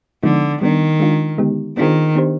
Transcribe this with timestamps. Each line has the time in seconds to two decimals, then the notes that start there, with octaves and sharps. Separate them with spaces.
0.23 D3 F3 G#3 B3 D#4
0.61 D#3 G3 B3 D4
1.00 G#3 D4 F4
1.38 D3 G#3 B3 D#4 G4
1.77 D#3 B3 D4 F4 G#4 C5
2.15 B3 D4 G4 C5